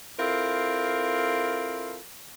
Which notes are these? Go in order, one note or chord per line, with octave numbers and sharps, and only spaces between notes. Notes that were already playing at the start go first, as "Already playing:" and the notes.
C4 E4 F4 A4 A#4